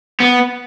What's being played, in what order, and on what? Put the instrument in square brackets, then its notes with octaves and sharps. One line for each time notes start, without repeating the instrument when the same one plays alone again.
[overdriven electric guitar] B3